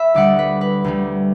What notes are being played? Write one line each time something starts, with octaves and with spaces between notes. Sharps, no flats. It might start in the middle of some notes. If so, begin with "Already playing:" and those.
Already playing: E5 B5
D2 D3 G3 D5 F#5
B4
B4
D2 D3 G3